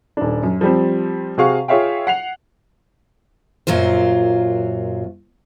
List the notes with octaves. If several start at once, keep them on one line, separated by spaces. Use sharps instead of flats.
D#1 D4
F#2
F3 G3 C4
C3 F#4 G#4 F5 C#6
F4 G#4 C#5 E5 F5 G5
F#5 C7 F7
F#2 A#2 F#3 F4 C5